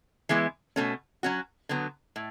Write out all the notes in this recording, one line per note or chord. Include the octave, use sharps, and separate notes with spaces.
E3 G#3 B3 E4
B2 A3 C#4
F#3 C#4 F#4
D3 F#3 B3
A2